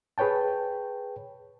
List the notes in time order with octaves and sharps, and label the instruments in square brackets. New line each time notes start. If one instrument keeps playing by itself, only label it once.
[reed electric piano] G#4 B4 C#5 G5 A5